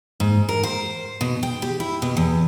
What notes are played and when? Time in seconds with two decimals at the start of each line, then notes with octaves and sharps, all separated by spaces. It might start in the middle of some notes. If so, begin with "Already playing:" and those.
0.20 G#2
0.49 A#4
0.63 C5
1.21 B2
1.43 G5
1.62 G4
1.80 E4
2.02 B2
2.17 E2